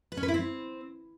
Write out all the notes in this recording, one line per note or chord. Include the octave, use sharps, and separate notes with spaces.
B4
C#4
B4
E4
C4